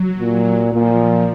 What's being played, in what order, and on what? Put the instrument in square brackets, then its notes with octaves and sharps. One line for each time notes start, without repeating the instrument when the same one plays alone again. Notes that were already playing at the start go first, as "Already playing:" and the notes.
Already playing: [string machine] F#3
[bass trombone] A#2
[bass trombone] A#2 [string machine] F3